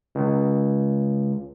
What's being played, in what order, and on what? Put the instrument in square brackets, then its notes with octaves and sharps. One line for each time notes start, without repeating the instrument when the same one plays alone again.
[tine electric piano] C#2